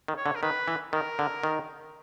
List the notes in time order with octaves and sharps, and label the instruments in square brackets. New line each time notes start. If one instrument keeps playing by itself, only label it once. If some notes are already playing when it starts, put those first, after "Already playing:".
[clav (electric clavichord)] D#3
[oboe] C#5
[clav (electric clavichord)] D3
[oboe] A#4
[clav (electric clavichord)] D#3 [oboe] B4
[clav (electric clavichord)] E3
[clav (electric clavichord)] D#3 [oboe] A#4
[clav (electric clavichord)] D3
D#3